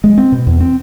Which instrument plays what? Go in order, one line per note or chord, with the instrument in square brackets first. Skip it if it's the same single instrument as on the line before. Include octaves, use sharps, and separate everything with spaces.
[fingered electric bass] G#3
C4
B2
E2
C4